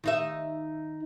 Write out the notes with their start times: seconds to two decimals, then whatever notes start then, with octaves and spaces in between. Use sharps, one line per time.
0.04 D#3 D#4 E5